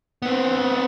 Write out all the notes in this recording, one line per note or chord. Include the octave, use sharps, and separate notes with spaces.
B3 C4